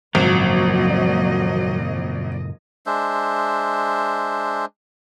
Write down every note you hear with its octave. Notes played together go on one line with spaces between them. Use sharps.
G#1 F#2 A#2 C#3 F3 F#3 A#3 D#5
G#3 D4 C5 E5